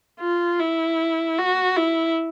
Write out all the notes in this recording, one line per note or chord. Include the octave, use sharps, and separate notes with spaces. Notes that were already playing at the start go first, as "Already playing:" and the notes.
F4
E4
F#4
E4